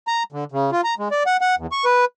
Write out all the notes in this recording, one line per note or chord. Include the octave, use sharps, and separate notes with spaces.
A#5
D3
C#3
F4
A#5
G#3
D5
F#5
F#5
E2
C#6
B4